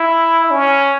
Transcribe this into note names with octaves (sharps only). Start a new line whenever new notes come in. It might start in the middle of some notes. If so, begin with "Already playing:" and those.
Already playing: E4
C#4